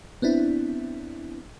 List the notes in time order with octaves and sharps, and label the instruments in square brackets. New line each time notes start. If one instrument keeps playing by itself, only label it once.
[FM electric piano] B3 C4 D4 E4